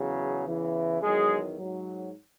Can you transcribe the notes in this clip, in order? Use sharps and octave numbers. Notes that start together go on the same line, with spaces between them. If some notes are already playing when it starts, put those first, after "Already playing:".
Already playing: E2 C#3 F#3
E2 C#3 E3
E2 D#3 F#3 G#3 G#4
G#2 F#3